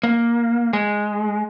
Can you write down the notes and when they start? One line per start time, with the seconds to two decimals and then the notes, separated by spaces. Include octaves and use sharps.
0.03 A#3
0.73 G#3